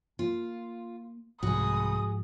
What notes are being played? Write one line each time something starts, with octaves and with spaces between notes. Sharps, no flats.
A#3 F4
C2 G#2 F3 G#3 F#4 G#4 D#6